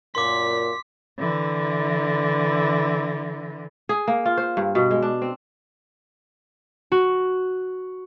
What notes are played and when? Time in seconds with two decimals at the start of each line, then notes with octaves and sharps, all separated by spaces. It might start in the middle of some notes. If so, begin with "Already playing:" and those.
0.15 F#2 A#2 C6 D6 B6
1.19 D3 E3
3.89 G#4
4.08 A#3
4.26 F4
4.37 C5
4.57 G2
4.75 B2
4.91 G#3
5.02 D4
5.22 C4
6.92 F#4